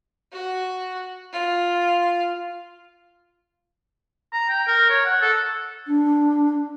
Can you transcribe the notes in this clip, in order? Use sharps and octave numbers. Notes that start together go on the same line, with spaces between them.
F#4
F4
A#5
G5
A#4
C#5
F#5
A4
D4